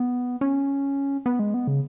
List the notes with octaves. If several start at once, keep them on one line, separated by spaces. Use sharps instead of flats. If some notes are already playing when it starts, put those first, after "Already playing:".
Already playing: B3
C#4
B3
G#3
B3
C#3